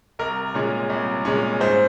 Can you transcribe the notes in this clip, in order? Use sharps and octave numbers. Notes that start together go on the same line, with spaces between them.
C2 A#4
A#2 G#3 C#4
C2
A#2 G#3 C#4
G#2 C5